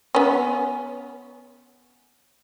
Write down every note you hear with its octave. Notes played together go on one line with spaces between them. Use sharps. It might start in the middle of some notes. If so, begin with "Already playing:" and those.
B3 C#4